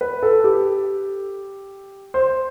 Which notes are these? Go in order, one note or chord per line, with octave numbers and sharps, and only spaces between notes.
B4
A4
G4
C5